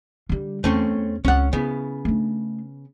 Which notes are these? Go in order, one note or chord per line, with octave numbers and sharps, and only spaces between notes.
D3 G3
E2 A3 C4 C#4
C#2 C4 C#4 F#5
C#3 B3 E4
A3 D4